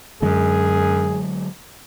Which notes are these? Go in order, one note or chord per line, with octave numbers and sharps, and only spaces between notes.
F#2 D3 F#3 G#3 G#4